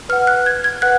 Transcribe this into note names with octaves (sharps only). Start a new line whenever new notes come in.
B4 F#5 F6
F#6
G#6
G#6
B4 F#5 F#6